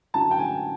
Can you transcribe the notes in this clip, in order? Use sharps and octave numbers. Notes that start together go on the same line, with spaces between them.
F#2 D3 F#3 A5
G5
G#5